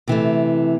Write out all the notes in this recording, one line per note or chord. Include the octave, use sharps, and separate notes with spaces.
C3 E3 A3